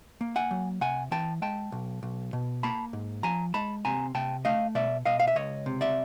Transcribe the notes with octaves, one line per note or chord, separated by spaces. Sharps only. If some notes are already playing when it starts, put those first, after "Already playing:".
A#3
F#5 G#5
F#3
C3 F#5 G#5
E3 G5 A5
G#3 G5 A5
B1
B1
B2
A#3 A5 B5
G#2
F3 G#5 A#5
G#3 A5 B5
C3 G#5 A#5
C3 G5 A5
A3 D#5 F5
B2 D5 E5
B2 D#5 F5
F5
E5
C#2 C#5 D#5
C3
D5 E5